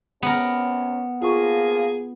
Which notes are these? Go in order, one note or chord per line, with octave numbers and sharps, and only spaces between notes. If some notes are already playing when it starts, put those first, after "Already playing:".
C3 B3 C#4 A#4
F3 A#3 F4 G#4 C#6